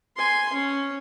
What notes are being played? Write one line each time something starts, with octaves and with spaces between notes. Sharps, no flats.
G#5 C6
C#4